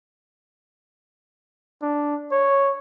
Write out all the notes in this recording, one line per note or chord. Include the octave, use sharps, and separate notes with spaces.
D4
C#5